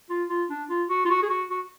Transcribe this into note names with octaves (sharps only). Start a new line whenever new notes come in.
F4
F4
D4
F4
F#4
F4
F#4
G#4
F#4
F#4